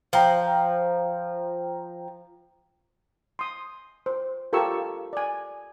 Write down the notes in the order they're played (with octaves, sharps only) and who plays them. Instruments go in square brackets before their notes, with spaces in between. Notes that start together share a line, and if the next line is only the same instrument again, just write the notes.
[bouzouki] F3 [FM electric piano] C5 G5 A#5
[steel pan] C6 D#6
C5
F4 G4 A4 A#4 C#6 E6
D5 G#5